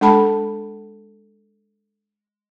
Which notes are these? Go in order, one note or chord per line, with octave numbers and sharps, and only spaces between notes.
G#3 D4 A4 A5 B5